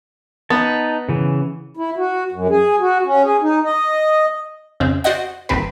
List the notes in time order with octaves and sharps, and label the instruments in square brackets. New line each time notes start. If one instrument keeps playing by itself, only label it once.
[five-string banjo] B3 [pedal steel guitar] D#4 A5
[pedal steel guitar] C#3 E3
[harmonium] E4
F#4
F#2
G#4
F#4
C#4
G#4
D#4
D#5
[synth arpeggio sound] F2 C#3 C4
F#4 C5 D5 D#5 F#5
G1 D#2 C4 B4